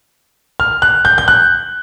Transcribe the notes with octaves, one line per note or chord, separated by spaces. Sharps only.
F6
F#6
G6
G6
F#6